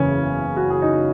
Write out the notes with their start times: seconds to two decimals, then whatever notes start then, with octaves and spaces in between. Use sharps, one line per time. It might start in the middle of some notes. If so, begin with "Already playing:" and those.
Already playing: F#1 E2 C#3 E3 C#4
0.57 F#4
0.70 G#4
0.82 D#4